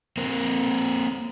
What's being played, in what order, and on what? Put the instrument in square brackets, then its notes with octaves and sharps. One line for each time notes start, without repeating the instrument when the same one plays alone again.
[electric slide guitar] A#3 C4 A#4 C5